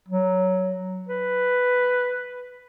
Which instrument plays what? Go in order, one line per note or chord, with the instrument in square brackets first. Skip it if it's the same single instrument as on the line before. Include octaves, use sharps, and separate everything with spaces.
[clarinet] F#3
B4